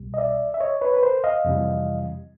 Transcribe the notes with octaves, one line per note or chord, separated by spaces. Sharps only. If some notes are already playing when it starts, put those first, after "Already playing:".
Already playing: C2 B2 G3
D#5
D5 E5
E5
C#5 D#5
B4 C#5
B4
A#4 C5
D#5 F5
F2 C3 E3 G3